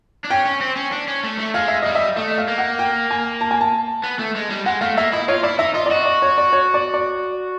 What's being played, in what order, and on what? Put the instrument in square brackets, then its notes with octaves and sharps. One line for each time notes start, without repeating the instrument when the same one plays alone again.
[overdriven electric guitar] D4
[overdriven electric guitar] C#4 [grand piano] G5
[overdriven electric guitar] C#4
C4
C#4
D4
C#4
A3
A3
[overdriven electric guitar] G#3 [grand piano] F5
[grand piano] E5
[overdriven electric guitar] G3 [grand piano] D#5
[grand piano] E5
[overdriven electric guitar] A3 [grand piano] D#5
[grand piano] F5
[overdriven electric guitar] A#3
[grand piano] F#5
G5
G#5
A5
G#5
A5
[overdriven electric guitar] B3
A3
G#3
G3
[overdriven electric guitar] G#3 [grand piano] F#5
[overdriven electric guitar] A3 [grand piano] F5
[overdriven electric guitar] A#3 [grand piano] E5
[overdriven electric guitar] E4 [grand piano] D#5
[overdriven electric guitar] F4 [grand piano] C#5
[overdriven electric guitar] E4 [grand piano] D5
[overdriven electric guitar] D#4 [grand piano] E5
[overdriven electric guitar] F4 [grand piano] D#5
[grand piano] D5
[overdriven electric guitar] F#4 [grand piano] D#5
[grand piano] D5
C#5
D5
C#5
D5
D5